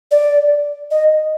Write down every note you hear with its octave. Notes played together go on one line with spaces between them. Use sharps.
D5
D#5